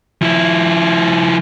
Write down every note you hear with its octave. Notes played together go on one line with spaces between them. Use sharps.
F3 E4